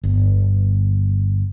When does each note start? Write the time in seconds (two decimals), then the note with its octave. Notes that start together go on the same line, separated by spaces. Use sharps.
0.04 G1